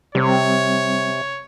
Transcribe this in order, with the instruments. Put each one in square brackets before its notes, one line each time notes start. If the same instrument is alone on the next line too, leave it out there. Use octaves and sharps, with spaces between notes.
[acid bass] C3 [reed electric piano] G3 C4 [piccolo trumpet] C#5